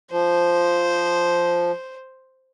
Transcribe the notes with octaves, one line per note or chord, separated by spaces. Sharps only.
F3 C5